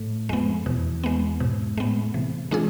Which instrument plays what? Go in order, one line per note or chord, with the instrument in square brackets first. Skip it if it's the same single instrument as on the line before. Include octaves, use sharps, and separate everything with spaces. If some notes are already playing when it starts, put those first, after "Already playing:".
Already playing: [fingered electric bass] A2
[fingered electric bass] F2 [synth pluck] G#3 B3
[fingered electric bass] E2 [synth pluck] B2
[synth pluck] G#3 B3
[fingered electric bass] G#2 [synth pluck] B2
[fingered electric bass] A2 [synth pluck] G#3 B3
[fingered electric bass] C3 [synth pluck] E3
[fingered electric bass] E3 [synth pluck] G#3 D4 F4 G#4